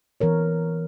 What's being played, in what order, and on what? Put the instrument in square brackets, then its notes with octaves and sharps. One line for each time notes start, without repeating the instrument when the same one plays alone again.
[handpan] E3 B3 A#4 C#5